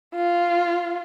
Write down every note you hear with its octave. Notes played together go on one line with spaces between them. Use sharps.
F4